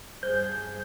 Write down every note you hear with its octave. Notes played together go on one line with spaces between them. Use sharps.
G2 G#4 C5 G6